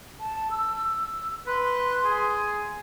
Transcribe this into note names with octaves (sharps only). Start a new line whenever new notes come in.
A5
E6
B4 C6
G#4